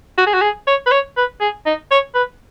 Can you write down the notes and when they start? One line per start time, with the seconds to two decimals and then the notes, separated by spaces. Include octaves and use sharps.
0.18 F#4
0.26 G#4
0.34 F#4
0.42 G#4
0.67 C#5
0.86 B4
0.91 C#5
1.17 B4
1.41 G#4
1.66 D#4
1.91 C#5
2.15 B4